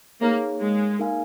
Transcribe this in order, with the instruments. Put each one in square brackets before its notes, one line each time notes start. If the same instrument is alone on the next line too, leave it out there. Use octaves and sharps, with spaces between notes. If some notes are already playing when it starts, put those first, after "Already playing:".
[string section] A#3 [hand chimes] D#4 G#4 C#5 F5
[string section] G#3
[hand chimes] A#3 D#4 A#4 F5 G#5